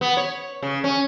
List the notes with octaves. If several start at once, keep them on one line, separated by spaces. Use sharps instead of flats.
B3
C#5
C#3
C#4